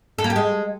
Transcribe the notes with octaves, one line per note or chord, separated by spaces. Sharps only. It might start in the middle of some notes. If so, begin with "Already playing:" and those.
A4
A#3
G4
G#3